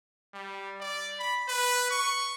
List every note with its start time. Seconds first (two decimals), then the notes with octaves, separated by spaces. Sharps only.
0.34 G3
0.80 D5
1.19 B5
1.48 B4
1.91 C#6